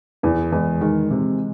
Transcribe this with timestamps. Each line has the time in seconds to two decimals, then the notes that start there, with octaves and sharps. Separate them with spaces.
0.23 E2 E3
0.52 E2 G#3
0.81 D#3 G#3
1.11 C3